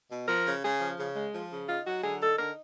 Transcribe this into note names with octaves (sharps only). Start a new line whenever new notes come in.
B2
F3 A#4
C#3
C#3 G#4
F3
C#3
G#3
F3
C#3
D#4 F4
F#3 F#4
D3 G#4
D#4 A4
D3 A#4